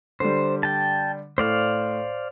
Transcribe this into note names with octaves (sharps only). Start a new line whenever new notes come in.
D3 G3 C5
G5 A5
A2 C5 D5 F5